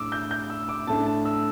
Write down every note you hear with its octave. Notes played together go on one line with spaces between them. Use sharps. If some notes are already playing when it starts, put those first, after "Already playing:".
Already playing: A2 D4 D6 E6
G6
G6
E6
D6
A2 A3 D4 A5
A5
E6